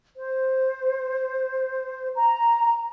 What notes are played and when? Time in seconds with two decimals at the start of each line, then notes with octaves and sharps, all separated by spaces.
0.16 C5
2.14 A#5